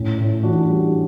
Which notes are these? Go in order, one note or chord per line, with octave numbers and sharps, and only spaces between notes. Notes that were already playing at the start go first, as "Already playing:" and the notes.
Already playing: A2 C#4 E4
A2
E3 D4 F#4
G3